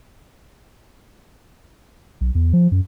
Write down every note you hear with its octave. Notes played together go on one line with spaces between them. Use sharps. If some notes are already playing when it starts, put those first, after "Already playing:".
B1
E2
F3
F#2